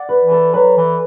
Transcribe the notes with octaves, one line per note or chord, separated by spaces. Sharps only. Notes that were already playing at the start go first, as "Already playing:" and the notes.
Already playing: D5 F#5
B4
E3
A4
F#3 B4
E3